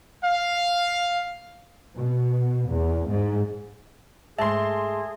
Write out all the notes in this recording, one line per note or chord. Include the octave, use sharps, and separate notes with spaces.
F5
B2
E2
G#2
G#2 A3 G#4 E5 A5 C6